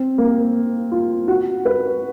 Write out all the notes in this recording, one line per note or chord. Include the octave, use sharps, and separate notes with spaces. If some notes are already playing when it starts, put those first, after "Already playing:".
Already playing: C4
A#3
F4
F#4
B4